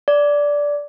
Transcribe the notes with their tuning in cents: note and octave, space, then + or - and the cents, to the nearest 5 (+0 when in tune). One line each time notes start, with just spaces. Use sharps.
D5 -10